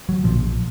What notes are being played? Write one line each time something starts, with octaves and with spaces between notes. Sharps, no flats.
F#3
A#1 A#2 F3